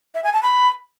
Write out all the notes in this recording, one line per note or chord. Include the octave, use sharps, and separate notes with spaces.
E5
G#5
A5
B5